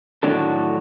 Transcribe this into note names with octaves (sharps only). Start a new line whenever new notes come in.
A2 D#3 F#3 B3 D4 A4